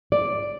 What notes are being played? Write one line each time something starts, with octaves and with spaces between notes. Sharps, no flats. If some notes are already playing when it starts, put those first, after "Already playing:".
D5